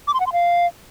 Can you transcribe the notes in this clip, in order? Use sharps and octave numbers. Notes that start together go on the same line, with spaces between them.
D6
C6
F#5
C6
F5